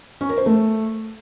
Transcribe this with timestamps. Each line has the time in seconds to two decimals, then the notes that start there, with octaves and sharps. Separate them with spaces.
0.21 C#4
0.29 A#4
0.38 C5
0.46 A3